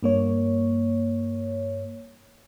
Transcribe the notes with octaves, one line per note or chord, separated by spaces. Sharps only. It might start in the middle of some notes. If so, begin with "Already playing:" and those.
G2 A#3 C#5